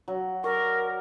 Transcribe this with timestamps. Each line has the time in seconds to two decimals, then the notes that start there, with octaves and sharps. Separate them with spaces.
0.08 F#3
0.44 A#4 D5 C#6